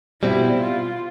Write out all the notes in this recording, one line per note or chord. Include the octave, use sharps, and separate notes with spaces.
B2 G3 C4 E4
F4